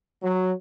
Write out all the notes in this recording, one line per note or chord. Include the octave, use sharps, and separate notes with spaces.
F#3